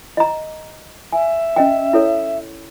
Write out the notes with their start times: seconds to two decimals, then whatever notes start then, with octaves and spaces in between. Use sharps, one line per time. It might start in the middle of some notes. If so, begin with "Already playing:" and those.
0.17 D#5 A#5
1.13 E5 G#5
1.56 C#4 D#5 G5
1.93 E4 A4 C#5